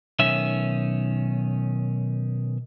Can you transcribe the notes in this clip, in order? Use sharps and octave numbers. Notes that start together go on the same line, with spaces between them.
B1 D#3 C#4 E5